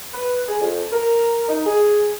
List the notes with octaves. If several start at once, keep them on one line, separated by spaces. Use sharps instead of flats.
B4
G#4
F2
A#4
D#4
G#4